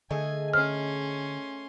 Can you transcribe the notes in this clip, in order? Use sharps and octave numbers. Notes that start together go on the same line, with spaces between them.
D3 A3 G#4 D#5 G#5
C#4 C6 F6